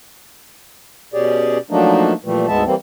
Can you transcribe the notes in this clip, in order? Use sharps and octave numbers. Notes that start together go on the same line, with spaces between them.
B2 C#4 G4 G#4 D5
F3 F#3 A3 A#3 D4 D#4
A#2 E3 F3 G3 A3
D2 G#2 G#3 B3 E5 A5
E3 G3 A#3 C4